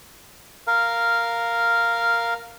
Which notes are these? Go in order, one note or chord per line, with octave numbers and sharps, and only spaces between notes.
A#4 F5